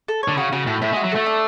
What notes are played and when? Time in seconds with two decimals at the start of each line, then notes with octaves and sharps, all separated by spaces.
0.08 A4
0.23 C#5
0.28 D3
0.37 C#3 F#4
0.52 C#3 F#4
0.67 A2 A4
0.82 A2 E5
0.93 G#3
0.96 F#4
1.04 F#3
1.12 A3 A4
1.26 D4